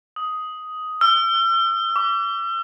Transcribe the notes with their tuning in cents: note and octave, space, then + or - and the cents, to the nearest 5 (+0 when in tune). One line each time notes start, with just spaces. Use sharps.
D#6 +10
E6 +45
D6 -40